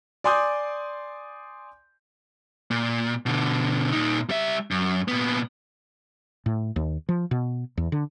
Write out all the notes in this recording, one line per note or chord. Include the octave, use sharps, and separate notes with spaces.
D5 G#5 C6 D6 D#6 G6
A#2
B2 D3
A#2 D#4
G3 E5
F#2
A#2 B3
A2
D#2
F3
B2
E2
D3